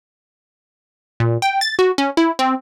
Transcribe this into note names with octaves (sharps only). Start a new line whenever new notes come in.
A#2
G5
A6
F#4
C#4
E4
C4